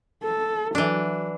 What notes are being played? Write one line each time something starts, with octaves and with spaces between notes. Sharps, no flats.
A4
E3 F#3 D4